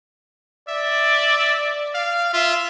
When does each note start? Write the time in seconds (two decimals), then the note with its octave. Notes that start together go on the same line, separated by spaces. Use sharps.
0.69 D5 E5
1.95 F5
2.33 F4 E5